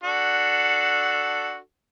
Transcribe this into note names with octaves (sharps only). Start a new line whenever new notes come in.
D4 F#4 A4